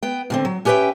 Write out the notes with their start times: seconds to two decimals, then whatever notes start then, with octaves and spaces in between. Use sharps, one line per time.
0.03 B3 G5
0.30 A2 D3 C4
0.45 F#3
0.65 C#4 G4 B4 D5 E5 G5